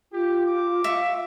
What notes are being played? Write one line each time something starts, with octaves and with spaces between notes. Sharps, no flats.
F4 G4
D6
E5 F5 C#6